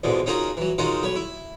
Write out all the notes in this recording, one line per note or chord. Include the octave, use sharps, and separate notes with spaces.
A1 F2 B2 D3 G#3
C#4 D#4 F4 F#4 G#4 A#4
E3 F#3
D#3 G#3 C#4 D#4 F4 F#4
B1 B4 C#5
E4